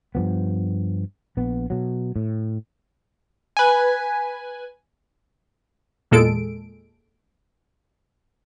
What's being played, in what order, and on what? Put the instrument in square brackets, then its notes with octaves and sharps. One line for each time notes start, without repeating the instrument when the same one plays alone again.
[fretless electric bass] G2 F3 B3
A#1 B3
B2 F#3
A2
[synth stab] B4 G#5
E2 A#2 G#3 A4 D7